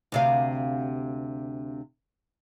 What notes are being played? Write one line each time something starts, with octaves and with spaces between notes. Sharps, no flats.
D2 C3 F5